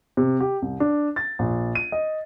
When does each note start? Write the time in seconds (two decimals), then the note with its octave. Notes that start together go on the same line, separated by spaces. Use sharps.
0.17 C3
0.40 G4
0.62 C2
0.80 D4
1.16 A6
1.39 A#1
1.75 D#7
1.92 D#5